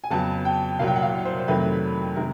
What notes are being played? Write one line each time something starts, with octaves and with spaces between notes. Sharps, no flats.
G#5
F2 C#3 F#3 B3 A5
G5
C2 A#2 F#3 F5
G5
F#5
F5
C5
C5
F2 C3 D#3 F#3 A3 B4
C3 D#3 G#3 A#4